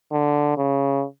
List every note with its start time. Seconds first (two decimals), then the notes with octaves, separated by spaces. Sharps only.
0.12 D3
0.57 C#3